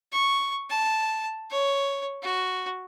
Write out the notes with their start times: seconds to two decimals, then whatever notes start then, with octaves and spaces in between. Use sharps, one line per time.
0.12 C#6
0.70 A5
1.50 C#5
2.22 F#4